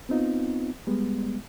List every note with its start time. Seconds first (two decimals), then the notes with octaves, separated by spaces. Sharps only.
0.09 B3 C4 D#4 F4
0.87 G3 G#3 B3